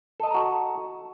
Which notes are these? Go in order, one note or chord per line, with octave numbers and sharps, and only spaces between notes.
F#4 A4 D#5 A5 A#5